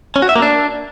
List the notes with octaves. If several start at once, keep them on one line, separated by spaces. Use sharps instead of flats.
C#4
F#4
E5
A#3
D4